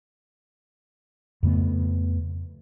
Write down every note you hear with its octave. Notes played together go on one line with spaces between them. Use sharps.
F2 C#3 A3 B3